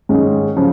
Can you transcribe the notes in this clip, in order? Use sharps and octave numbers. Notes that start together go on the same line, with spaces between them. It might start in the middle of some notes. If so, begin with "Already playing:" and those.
G#2 D#3 G#3 C#4
C#3 F3